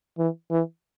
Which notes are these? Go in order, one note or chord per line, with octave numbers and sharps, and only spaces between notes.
E3
E3